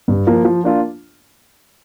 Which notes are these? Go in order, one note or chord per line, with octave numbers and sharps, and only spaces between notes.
G2
F3 A#3
F3
A#3 D4 F4